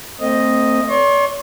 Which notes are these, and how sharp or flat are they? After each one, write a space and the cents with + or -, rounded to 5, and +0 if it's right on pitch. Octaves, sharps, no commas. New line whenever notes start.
A3 +35 C4 +0 D#5 +0
C#5 +45 C6 +40